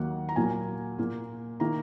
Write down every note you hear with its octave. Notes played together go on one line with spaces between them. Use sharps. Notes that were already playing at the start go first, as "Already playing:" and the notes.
Already playing: D#2 D#3 F#3 A#3 F#5
A#5
A#2 F#3 A#3 G#5
A#2 A#3
D#3 A#3 A#5